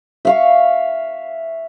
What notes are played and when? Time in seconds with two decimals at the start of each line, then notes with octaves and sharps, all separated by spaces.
0.25 E5 F5 C#6